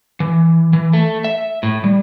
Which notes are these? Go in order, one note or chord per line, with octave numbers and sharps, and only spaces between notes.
E3
E3
A3
E5
A2
G3